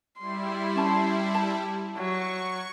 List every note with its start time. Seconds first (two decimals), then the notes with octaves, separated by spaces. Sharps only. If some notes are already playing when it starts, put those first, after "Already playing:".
0.19 G3 E4 C6
0.75 C#4 A5
1.35 A5
1.97 F#3 C#6